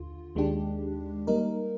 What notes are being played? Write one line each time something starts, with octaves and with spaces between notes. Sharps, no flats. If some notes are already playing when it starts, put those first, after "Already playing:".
Already playing: D#2 D3 F4
D#2 D#3 G#3 D4 G4
G3 A#3 D#4 A#4